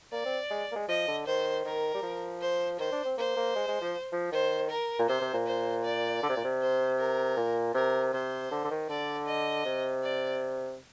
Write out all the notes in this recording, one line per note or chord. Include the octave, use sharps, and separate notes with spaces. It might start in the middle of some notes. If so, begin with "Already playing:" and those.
A#3 D5
C4
G#3
A#3
G#3
F3 D#5
D3
D#3 C5
D#3 A#4
G3
F3
C5
D#3 C5
D4
C4
A#3 C5
A#3
G#3
G#3
F3
F3
D#3 C5
A#4
A#2
C3 C5
C3
A#2
C5
D5
D3
C3
A#2
C3
C5
A#4
A#2
C3 A#4
C3 C5
D3
D3
D#3
D3 D5
D#5
C3
D5